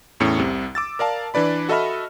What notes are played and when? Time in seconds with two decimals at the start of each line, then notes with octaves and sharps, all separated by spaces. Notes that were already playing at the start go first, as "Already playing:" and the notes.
0.20 E2 A2 C#4 C#7
0.39 C2 C3
0.75 D6 E6 A6
0.99 A#4 D5 F5 A5
1.34 E3 D4 B4 D5 B5
1.69 F#4 A4 D#5 E5 B5 F6